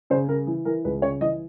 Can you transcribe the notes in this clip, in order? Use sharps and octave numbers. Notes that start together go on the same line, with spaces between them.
C#3 C5
C#3 A#4
E3
E3 A#4
C#2 B4
C#3 C#5
E3 D#5